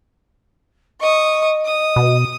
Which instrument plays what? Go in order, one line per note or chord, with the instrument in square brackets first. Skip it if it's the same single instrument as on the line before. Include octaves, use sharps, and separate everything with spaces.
[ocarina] D#5 [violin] C#6 D#6
[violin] D#6
[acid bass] B2